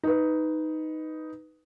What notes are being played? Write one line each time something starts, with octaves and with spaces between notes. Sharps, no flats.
D#4 B4